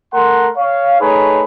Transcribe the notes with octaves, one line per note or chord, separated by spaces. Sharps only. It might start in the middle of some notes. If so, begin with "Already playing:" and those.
A3 A#4 F#5 C6
C#5 F5
A3 D#4 G#4 B4 C#5